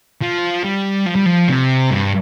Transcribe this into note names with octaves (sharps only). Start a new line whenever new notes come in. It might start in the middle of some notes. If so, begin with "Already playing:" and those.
F3
G3
F3
G3
F3
C3
G2